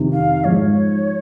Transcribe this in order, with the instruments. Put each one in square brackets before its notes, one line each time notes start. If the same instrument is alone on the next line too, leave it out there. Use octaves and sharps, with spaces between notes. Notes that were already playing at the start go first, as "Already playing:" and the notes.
Already playing: [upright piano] F2 C3 D#3
[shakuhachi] F5
[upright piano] G#2 F3 G#3 [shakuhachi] C#5